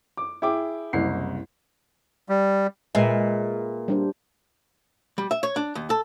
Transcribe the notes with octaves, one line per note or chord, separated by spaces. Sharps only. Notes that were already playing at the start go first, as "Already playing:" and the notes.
D6
E4 G#4 G5 D6
F#1 C2 C7
G3
A#2 G#3 B4 E5
G3 D4 C5
G3
E5
C#5
D4
D#2
A4